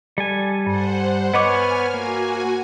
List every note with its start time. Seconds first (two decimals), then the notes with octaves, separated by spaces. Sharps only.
0.18 G3 A4 G#5
0.67 G2 C5 F#5
1.34 B3 B4 C#5 D#5 F#5 G#5 D6 F6
1.94 A#3 F#4 G#5